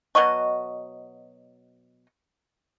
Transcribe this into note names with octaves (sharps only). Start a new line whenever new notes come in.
B2 F#3 D#5 C#6